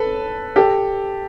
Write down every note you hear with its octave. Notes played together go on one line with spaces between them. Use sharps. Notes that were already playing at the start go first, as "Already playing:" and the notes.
Already playing: A4 B4
G4 A4